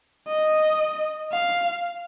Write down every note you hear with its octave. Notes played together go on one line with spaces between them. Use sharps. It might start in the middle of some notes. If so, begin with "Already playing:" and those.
D#5
F5